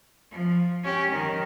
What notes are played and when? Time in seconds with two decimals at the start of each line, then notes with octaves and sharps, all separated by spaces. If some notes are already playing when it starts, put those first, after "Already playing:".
0.31 F3
0.83 C#4 G4
1.12 D#3